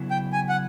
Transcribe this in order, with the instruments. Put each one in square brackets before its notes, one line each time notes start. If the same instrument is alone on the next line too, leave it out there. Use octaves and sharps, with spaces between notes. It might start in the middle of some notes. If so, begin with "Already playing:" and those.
Already playing: [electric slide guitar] C#3 F#3 B3 E4
[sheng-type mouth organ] G5
G#5
F#5